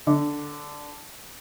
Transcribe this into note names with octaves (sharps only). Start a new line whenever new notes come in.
D3